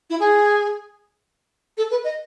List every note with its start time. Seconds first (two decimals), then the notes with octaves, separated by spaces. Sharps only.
0.10 E4
0.20 G#4
1.77 A4
1.91 B4
2.04 D#5